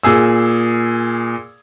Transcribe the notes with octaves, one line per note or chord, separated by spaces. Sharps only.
A#2 A#3 G#4 E6